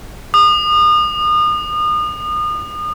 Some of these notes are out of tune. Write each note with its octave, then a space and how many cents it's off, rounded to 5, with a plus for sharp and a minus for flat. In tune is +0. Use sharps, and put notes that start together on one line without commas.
D#6 -35